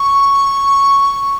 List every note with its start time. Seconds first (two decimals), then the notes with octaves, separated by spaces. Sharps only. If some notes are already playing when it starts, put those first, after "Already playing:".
Already playing: C#6